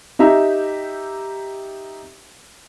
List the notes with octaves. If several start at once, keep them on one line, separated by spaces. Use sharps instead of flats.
D#4 G4 E5 A#5